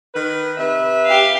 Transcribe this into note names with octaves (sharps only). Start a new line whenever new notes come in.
D#3 B4
C3 B4 E5
G4 F5